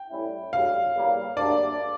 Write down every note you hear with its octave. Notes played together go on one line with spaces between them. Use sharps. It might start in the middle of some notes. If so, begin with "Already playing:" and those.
Already playing: G5
A2 G3 C#4 E4
D2 C#3 G3 F5
E2 C#3 G3 A#3
D2 C#3 G3 A#3 D4 D5